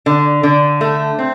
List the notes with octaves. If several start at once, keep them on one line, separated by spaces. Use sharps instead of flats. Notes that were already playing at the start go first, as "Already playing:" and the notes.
D3
D3
A3
C4